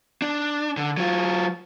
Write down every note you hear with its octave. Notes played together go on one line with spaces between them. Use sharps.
D4
D3
F#3 F4